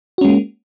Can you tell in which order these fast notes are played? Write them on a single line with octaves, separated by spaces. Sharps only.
F#4 C#4 G#3 A#3